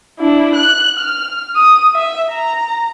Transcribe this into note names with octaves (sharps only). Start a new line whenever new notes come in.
D4 E4
F#6
F6
D#6
E5
A#5